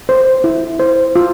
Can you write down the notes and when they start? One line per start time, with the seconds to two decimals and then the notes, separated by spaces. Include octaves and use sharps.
0.09 C5
0.44 E4
0.80 C5
1.16 F4